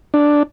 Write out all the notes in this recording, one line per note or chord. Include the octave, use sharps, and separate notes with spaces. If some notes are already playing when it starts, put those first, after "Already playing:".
D4